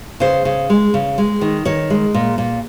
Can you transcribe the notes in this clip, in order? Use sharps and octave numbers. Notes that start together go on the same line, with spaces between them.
C#3 C5
C#3
G#3
C#3
G#3
D#3
D#3 C#5
G#3
A#2
A#2